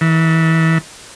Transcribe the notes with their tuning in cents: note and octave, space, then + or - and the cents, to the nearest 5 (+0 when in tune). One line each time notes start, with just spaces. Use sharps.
E3 -25